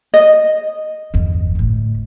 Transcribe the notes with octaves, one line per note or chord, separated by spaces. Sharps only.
D#5
G1 E2
D2 A2